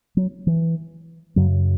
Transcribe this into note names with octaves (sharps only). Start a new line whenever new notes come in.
F#3
E3
F#2 C#3 F#3